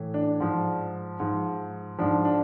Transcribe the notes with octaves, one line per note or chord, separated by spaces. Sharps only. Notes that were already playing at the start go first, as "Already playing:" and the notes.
Already playing: A2 E3
D4
G#2 F3
G#2 F3
G#2 F3 D4
D4